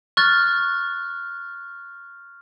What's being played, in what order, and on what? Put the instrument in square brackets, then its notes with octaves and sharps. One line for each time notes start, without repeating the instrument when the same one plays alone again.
[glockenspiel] C#6 F6 F#6 A6